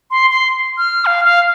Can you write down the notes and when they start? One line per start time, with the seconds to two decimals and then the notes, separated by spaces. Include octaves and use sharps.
0.11 C6
0.30 C6
0.78 F6
1.06 F5
1.25 F5